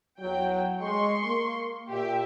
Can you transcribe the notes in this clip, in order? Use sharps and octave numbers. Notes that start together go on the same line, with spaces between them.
E2 F#3 G5
G#3 C6 C#6
A#3
A#2 G4 E5